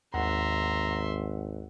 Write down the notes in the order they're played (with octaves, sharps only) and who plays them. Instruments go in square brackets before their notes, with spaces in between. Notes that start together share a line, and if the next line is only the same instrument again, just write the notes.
[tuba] G#1 [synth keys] D#2 F#5 [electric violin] E5 C6 [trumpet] A#5